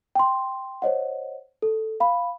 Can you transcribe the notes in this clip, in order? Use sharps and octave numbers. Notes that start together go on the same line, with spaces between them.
G5 C6
C5 C#5 D#5 F#5
A4
F5 B5